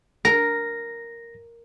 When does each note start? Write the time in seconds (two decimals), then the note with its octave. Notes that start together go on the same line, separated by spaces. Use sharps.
0.25 A#4 A#6